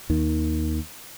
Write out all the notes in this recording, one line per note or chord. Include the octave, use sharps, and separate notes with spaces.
D#2 D#3